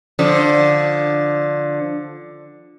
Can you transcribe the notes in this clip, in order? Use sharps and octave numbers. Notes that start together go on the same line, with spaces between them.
D3 F3